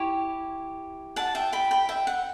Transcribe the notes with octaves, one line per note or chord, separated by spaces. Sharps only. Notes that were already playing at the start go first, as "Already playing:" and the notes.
Already playing: E4 G4 C#5
F#5 A5
E5 G5
G5 B5
G5 B5
E5 G5
F#5